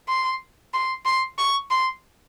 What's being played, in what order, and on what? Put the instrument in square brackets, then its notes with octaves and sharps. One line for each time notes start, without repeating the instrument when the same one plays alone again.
[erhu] C6
C6
C6
C#6
C6